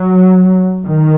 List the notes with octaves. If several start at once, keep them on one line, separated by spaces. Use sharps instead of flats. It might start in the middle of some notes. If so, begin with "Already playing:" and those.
Already playing: F#3
D#3